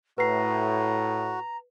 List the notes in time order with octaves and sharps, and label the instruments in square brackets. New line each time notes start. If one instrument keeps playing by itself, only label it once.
[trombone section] A2 [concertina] F#4 [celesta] B4 C7 [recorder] A#5